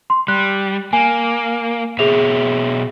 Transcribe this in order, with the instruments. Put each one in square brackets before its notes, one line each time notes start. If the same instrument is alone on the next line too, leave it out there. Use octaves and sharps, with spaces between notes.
[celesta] C6
[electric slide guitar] G3 [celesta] F#6
[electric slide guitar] A#3 [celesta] G#5
[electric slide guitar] B2 C#5 E5 [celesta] G#4 F7